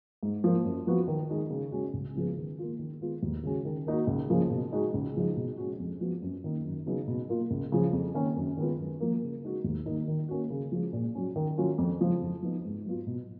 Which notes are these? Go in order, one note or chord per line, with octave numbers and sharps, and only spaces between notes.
G#2
F3 A#3
F#2
F3 B3 F#4
D#3
G#3 D#4
C#3
G#3 C#4 F#4
C#2
C#3 F3 G#3 B3
D#3
A#3 F4
D#3
G#3 B3 F4
D#2
C#3 G#3 C#4 F#4
D#3
A#3 D#4 F#4
C#2
C#3 F3 A#3
B2
G#3 D#4 F#4
C#2
C#3 F3 G#3 D#4
B2
G#3 C#4 F#4
F2
F3 B3 F#4
F#2
D#3 A#3 D#4
F#2
C#3 F#3 B3 D#4
B2
A#3 F4
C#2
C#3 F3
F2
D#3 A#3 C#4
F#2
D#3 G#3 B3 F4
F#2
F3 A#3
C#3
G#3 D#4 F#4
D#2
D#3 A#3 D#4
D#3
A#3 C#4 F#4
C#3
F3 G#3
A#2
F#3 C#4
D#3
F#3 C#4 F4
F2
C#3 F3 G#3
F2
F3 B3 D#4
G#2
F#3 B3 F4
B2